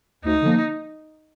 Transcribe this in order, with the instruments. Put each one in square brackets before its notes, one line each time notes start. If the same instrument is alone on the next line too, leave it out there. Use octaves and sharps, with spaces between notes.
[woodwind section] D2 [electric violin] D#4
[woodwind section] D3 F3 A#3